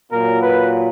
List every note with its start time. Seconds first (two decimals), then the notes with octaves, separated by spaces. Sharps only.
0.12 A#2 F#3 A#4
0.41 B4